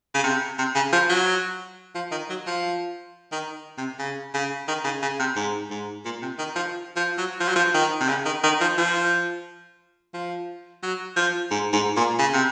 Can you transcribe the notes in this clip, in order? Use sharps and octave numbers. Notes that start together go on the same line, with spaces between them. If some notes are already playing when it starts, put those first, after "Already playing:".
C#3
C3
C3
C#3
F3
F#3
F3
D#3
F#3
F3
D#3
C3
C#3
C#3
D#3
C#3
C#3
C3
G#2
G#2
A#2
C3
D#3
F3
F3
F#3
F3
F#3
F3
D#3
C3
C#3
D#3
D#3
F3
F3
F3
F#3
F3
G#2
G#2
A#2
C#3
C3